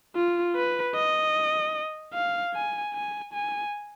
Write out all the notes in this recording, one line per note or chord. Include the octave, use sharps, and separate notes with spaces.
F4
B4
D#5
F5
G#5
G#5
G#5